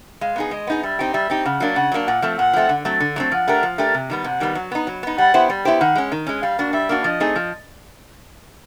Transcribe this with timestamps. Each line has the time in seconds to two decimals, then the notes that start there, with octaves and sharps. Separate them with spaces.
0.21 G#3 F5
0.36 B3 D#4 G#4
0.51 G#3 D#5
0.67 B3 D#4 G#4
0.83 G3 E5
0.99 C4 D#4 G4
1.14 G3 E5
1.30 C4 D#4 G4
1.45 C#3 F#5
1.60 F#3 A#3 D4
1.76 C#3 F#5
1.92 F#3 A#3 D4
2.07 A#2 F#5
2.22 F3 A3 C4
2.38 A#2 F#5
2.53 F3 A3 C4
2.69 D3
2.85 F#3 A3 C4
3.00 D3
3.16 F#3 A3 C4
3.32 F3 F#5
3.48 A3 D4 G4 A#4
3.63 F3
3.78 A3 D4 G4 A#4
3.94 C3
4.10 D#3 G3 B3
4.24 C3 F#5
4.40 D#3 G3 B3
4.55 F#3
4.71 B3 D#4
4.87 F#3
5.03 B3 D#4
5.18 G3 F#5
5.34 B3 E4 G4 C5
5.49 G3
5.65 B3 E4 G4 C5
5.80 D#3 F#5
5.95 G#3 C#4
6.12 D#3
6.27 G#3 C#4
6.42 G3 F5
6.59 A#3 D4 F#4
6.73 G3 E5
6.89 A#3 D4 F#4
7.04 F3 D#5
7.20 A3 C4 D#4 G#4
7.36 F3